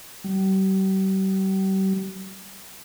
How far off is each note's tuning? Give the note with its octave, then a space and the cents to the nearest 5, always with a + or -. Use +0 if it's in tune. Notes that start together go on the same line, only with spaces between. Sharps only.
G3 -40